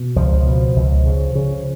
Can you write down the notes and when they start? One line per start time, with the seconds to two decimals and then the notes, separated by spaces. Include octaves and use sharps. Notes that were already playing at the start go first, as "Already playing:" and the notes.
Already playing: B2
0.16 C#2 F3
0.46 B2
0.76 C#2
1.06 C#3
1.35 C#3